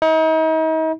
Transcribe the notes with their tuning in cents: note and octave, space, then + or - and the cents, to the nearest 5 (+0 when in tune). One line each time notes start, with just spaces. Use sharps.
D#4 +40